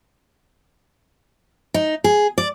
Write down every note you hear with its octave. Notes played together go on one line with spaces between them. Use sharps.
D#4
G#4
D5